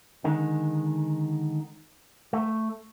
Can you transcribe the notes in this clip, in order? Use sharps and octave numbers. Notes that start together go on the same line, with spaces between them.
D3 D#3 G#3
A3